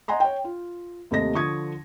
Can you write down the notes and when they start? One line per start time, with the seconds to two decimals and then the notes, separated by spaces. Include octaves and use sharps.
0.08 D#5 F#5 G#5 A#5 C6
0.20 C#5 G5
0.44 F4
1.11 D#2 C3 A3 D#5 A#6
1.34 D3 F3 C#6 D#6 G#6